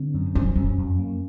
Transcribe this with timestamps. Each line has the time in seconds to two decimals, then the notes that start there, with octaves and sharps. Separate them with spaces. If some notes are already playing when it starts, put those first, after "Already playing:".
Already playing: D3 C4
0.14 F#2
0.35 F3 C#4
0.56 F#2 C#4
0.78 F2
0.99 A#3